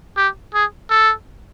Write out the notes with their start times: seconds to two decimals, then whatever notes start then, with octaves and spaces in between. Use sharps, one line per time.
0.17 G4
0.54 G#4
0.90 A4